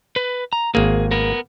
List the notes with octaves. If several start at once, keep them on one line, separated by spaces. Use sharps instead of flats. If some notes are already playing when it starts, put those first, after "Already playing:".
B4
A#5
G#1 A#3 G#4
B3 A#4